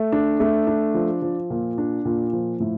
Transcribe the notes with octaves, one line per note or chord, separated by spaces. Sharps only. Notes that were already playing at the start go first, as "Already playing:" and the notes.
Already playing: A3
D4
A3
D4
F3
F3
A#2
D4
A#2
F3
A2